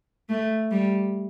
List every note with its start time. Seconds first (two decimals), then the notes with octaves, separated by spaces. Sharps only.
0.29 A3
0.71 G3